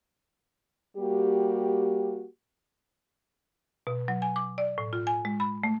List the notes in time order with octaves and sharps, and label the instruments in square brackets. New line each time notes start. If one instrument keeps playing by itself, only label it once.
[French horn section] G3 A#3 F#4 G4
[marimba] B2
F#3
G#5
D6
D5
A2
F4
G#5
G#3
B5
A3